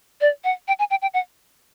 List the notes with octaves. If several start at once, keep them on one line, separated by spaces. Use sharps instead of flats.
D5
F#5
G5
G#5
G5
G5
F#5